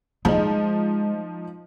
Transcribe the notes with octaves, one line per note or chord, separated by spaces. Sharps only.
F3 G#3 D#4